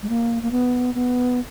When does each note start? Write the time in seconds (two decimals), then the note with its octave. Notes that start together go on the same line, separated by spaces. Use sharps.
0.02 G#3
0.09 A#3
0.43 A#3
0.51 B3
0.95 B3